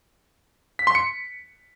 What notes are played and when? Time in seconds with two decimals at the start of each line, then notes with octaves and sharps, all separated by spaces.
0.79 B6
0.87 C6
0.95 C#7